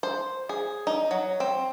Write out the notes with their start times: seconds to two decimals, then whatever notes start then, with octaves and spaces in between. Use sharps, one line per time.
0.03 C5
0.49 G#4
0.87 D#4
1.11 F#3
1.40 C4